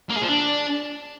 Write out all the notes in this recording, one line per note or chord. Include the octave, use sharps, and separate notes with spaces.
A#3
G#4
F3
D4